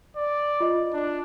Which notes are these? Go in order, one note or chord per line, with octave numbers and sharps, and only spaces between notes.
D5
F4 D#5
D4